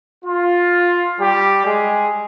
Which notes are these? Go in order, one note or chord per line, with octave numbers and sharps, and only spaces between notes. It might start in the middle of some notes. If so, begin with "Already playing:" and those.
F4
G3 G4
G#3 G#4